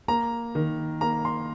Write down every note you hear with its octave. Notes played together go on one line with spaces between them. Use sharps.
A#3 A#5
D#3
A#3 A#5
C6